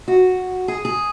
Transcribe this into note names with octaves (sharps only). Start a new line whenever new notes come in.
F#4
G#4
G#4